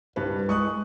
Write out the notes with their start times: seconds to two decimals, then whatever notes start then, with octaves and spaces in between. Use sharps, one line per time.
0.16 C2 G2 B4
0.49 G#3 C#6 D#6 F#6